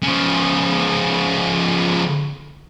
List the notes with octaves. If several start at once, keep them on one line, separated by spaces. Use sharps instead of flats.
C#3 F3